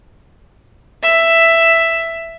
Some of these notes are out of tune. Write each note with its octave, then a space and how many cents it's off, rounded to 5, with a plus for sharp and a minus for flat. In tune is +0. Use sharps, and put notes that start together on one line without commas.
E5 +5